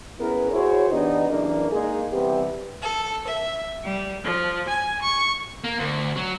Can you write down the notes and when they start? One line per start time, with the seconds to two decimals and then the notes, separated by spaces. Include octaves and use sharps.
0.19 B3 C#4 E4 G#4 A#4 B4
0.52 E4 F#4 G#4 C5 C#5
0.91 E3 B3 D4 D#4 G4 D#5
1.27 F#2 C#3 E3 A#3 D4
1.71 G#3 A#3 D#4 G#4
2.12 C3 E3 G3 B3 G4
2.81 A4
3.26 E5
3.83 G3
4.24 F3
4.68 G#5
5.01 C#6
5.64 A#3
5.79 D2
6.16 F#3